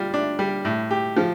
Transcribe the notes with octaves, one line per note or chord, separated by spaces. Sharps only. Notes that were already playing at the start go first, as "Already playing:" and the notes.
Already playing: G3 F4
D4
G3
A2
G4
F3